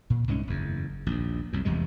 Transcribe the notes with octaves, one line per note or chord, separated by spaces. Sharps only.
A#2
C2 G#2 G#3 C#4
F#1 E2
A#1 D#2
C2 F#2
F1 E2 C3 G#3